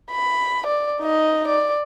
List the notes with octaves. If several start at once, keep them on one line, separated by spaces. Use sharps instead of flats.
B5
D5
D#4 D#5
D5